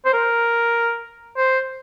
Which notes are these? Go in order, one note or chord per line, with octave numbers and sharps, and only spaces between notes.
C5
A#4
C5